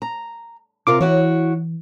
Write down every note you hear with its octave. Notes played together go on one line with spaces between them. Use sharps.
A#5
C3 F4 A#4 D6
E3 E4 F#4 C#5